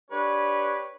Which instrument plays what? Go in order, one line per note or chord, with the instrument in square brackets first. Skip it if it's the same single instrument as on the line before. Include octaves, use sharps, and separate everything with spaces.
[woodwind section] D4 G4 B4 C#5